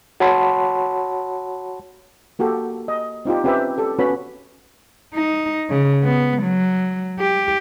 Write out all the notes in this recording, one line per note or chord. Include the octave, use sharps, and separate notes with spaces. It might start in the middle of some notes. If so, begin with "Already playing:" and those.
F#4 C#5 F#5 A5 B5 C6
A#3 F#4 G4 A4
D#5
C4 D#4 F4 G4
C4 C#4 G4 B4 E5
G4 A4
B3 C#4 F#4 B4 C#5 B5
D#4
C#3
B3
F#3
G4